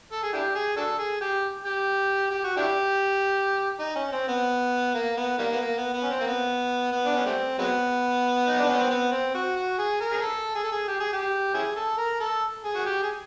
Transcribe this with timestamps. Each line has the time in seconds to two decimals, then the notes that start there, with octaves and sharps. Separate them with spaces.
0.12 A4
0.23 G#4
0.33 D4 E4 G4
0.55 G#4
0.77 D4 F#4 A4
0.99 G#4
1.21 G4
1.65 G4
2.31 G4
2.44 F#4
2.57 D4 E4 G4
3.79 D#4
3.96 C#4
4.12 C4
4.28 B3
4.95 A#3
5.17 B3
5.39 D#3 G3 A#3
5.51 B3
5.61 A#3
5.77 B3
5.94 B3
6.03 C#4
6.10 C4
6.21 A#3
6.27 B3
6.92 B3
7.05 D4
7.16 C#4
7.26 G3 A3 C4
7.59 F#3 G#3 B3
8.48 D#4
8.59 D4
8.69 C#4
8.79 C4
8.90 B3
9.12 C4
9.35 F#4
9.56 F#4
9.78 G#4
10.00 A#4
10.12 G#4
10.22 A4
10.55 G#4
10.64 A4
10.72 G#4
10.88 G4
11.00 G#4
11.13 G4
11.54 C#4 E4 G#4
11.76 A4
11.98 A#4
12.20 A4
12.64 G#4
12.75 F#4
12.86 G4
13.03 G#4